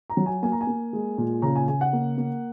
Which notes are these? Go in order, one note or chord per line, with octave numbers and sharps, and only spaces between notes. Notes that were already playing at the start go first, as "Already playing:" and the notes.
A#5
F#3
G#5
A#3 G#5
A#5
G#5
A#3
G#3
A#2
C#3 A#5
G#5
C#3 G#5
F#5
A#3
A#3